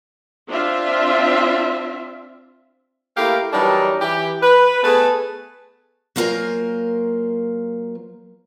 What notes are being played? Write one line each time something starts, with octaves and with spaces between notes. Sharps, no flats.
C4 D4 F4 E5
A3 A#3 E4 G4 A#4 F5
E3 F#3 G3 D4 D#4 A#4
E3 G4
B4
A3 B3 G#4 B4 A5
F#3 A#3 F4 A#4 C5 G#5